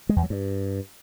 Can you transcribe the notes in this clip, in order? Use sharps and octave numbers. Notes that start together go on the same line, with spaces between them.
G#3
E2
F#3
G2